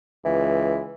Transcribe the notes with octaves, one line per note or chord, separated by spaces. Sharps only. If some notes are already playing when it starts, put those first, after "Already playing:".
C#2 E3